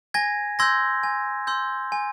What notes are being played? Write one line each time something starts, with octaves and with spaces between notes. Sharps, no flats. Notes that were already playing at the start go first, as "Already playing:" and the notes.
G#5 G#6 A#6
C6 E6 G6 G#6 A#6
G#5
C6 E6 G6
G#5